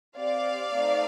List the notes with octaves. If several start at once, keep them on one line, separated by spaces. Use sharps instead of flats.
C4 G4 D5 F5
A3 C4 D#4